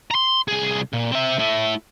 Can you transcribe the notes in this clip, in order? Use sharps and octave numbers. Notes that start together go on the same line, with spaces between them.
A#5 C6
C2 G#4
A#2
C4 E5
A3 E4